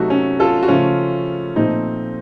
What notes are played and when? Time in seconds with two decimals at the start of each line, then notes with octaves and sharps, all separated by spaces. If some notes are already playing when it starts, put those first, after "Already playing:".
Already playing: C3 F#3 A3 D#4 F#4
0.10 C#4
0.40 F4 A4
0.63 F#4
0.68 C#3 F3 A3 C#4 F4
1.56 A#2 F3 A3 C4 D#4